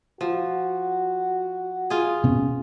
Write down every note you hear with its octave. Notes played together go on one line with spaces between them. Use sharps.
F3 F#4
F4 G#4
B2 B3 C#4